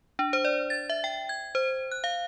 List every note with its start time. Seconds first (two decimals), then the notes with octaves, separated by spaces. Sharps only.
0.19 D4
0.33 C5
0.45 D5
0.70 A6
0.90 E5
1.04 G5
1.29 G#6
1.55 C5
1.92 F#6
2.04 F5